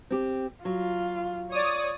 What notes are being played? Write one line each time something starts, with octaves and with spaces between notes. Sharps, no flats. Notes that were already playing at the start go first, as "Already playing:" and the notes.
C4 G4
F#3 F4
C#5 D5 D#6